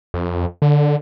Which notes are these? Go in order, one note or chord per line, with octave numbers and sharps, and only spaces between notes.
F2
D3